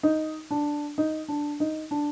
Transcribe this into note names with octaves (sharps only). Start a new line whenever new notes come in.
D#4
D4
D#4
D4
D#4
D4